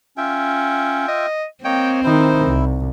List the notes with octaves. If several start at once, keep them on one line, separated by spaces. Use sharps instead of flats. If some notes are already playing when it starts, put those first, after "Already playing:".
C#4 F4 E5 G5
D#5
A#3 C4 C#5 D#5 G5
D#3 D#4 E4 C5
C2